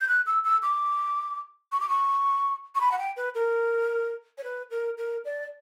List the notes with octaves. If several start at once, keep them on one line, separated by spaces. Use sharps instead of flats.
G6
F#6
E6
E6
D6
C#6
D6
C#6
C#6
B5
F#5
G5
B4
A#4
C#5
B4
A#4
A#4
D5